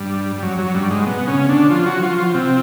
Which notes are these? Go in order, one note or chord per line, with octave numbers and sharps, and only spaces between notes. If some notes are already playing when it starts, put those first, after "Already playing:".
Already playing: G2 G3
G3
F#2 F#3
F#2 F#3
G2 G3
G#2 G#3
B2 B3
C#3 C#4
D3 D4
F3 F4
F#3 F#4
F3 F4
F3 F4
C3 C4